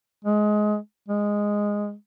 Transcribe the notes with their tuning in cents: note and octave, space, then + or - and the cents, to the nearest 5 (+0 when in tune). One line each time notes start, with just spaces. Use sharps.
G#3 +20
G#3 -10